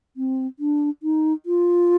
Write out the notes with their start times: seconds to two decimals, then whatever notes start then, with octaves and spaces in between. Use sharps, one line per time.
0.17 C4
0.59 D4
1.03 D#4
1.46 F4